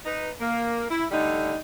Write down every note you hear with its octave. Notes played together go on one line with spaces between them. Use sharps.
D#4 B4
A#3
E4
D3 G3 A3 D#4